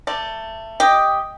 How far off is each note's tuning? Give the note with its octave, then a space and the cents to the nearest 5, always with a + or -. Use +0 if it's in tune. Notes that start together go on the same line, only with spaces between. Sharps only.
A3 +20 D5 +0
G4 +5 D#5 +5